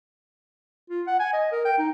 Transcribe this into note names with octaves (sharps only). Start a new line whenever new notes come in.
F4
F#5
G#5
D#5
A#4
G5
D#4